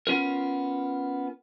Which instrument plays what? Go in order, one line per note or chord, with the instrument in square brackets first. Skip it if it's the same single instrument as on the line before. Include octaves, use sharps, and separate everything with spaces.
[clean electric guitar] B3 C#4 F4 A#4